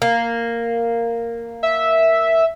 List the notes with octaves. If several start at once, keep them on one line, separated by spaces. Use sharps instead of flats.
A#3
E5